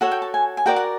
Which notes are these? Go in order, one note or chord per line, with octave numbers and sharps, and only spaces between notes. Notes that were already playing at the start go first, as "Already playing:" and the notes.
F#4 A4 C#5 F#5
G5
A5
G#5
G#5
F#4 A#4 D5 G5
F#5